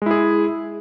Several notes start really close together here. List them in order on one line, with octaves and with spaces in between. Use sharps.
G#3 E4 G#4